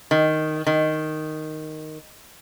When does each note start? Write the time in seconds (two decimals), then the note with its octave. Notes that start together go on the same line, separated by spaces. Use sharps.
0.11 D#3
0.67 D#3